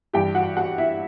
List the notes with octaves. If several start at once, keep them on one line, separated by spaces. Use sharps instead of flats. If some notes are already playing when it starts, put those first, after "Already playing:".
G2 E3 G4 G5
F#4 F#5
F#4 F#5
E4 E5